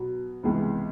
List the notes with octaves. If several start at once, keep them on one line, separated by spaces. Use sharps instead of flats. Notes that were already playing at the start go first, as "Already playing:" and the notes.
Already playing: B2 F#3 B3
C#2 C3 E3 G#3 B3